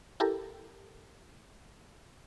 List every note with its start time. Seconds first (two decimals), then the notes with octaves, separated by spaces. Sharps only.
0.20 E4 G4 A4 A#4